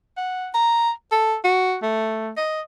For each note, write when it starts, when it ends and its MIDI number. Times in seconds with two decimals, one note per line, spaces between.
0.17 0.49 78
0.54 0.90 82
1.12 1.35 69
1.44 1.77 66
1.82 2.30 57
2.37 2.61 75